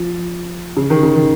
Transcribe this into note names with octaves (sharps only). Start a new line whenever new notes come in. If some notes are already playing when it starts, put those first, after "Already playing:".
Already playing: F3
C#3
D#3
C#3
D#3